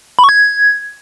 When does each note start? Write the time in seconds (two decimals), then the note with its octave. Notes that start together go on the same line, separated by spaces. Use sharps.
0.19 B5
0.24 C#6
0.29 G#6